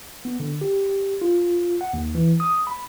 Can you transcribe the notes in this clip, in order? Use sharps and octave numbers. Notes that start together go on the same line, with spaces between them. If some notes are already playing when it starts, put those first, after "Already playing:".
B3
D3
G4
F4
F#5
D#2
E3
D#6
B5